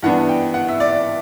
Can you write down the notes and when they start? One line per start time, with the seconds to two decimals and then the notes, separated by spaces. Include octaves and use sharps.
0.03 G2 E3 B3 D4 F#5
0.29 G5
0.54 F#5
0.68 E5
0.80 D5